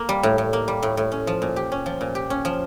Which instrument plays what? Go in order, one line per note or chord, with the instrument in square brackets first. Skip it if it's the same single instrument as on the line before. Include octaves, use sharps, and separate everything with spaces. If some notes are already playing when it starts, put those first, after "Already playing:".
Already playing: [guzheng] A#3
G3
A2
A2
A#3
G3
A2
A2
C#4
F3
A#2
G4
C#4
F3
A#2
G4
C#4
F3